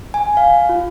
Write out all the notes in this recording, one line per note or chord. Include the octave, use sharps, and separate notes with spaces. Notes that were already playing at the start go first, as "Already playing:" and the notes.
G#5
F5
F4